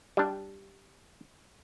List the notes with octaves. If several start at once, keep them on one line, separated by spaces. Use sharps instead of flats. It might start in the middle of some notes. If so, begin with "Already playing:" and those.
G3 D4